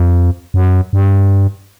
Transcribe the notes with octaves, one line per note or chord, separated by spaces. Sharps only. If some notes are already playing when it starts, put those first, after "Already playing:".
Already playing: F2
F#2
G2